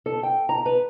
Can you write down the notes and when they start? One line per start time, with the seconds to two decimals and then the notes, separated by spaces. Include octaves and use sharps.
0.06 A4
0.23 G5
0.49 A#5
0.66 B4